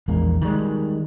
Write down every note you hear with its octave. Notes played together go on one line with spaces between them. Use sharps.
A#1 E2 G#3 A#3
D#3 E3 G3 G#3